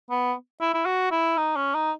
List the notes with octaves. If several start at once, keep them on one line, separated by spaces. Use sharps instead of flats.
B3
E4
E4
F#4
E4
D#4
C#4
D#4